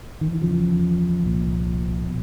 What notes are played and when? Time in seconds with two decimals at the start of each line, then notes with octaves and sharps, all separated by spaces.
0.21 D#3
0.32 E3
0.42 E2 C#3 F3
1.22 C2 A#2
2.07 B2